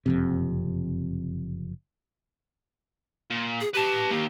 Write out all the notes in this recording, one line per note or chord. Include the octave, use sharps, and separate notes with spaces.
F#1 F2 C3
A#2
G#4
G4 B4 A5
D#3 A#3